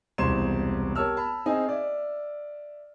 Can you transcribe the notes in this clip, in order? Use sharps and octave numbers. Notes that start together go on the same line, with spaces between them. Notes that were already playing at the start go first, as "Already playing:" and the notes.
E1 C2 C5 C6 G#6 E7
G4 A#4 C#5 A5 E6 F6
A5 B5
C4 D#4 G#4 D#5 G#5
D5 E5